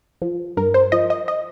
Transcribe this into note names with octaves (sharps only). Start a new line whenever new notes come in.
F3
G2 A#4
C5
F3 D#5
D#5
D#5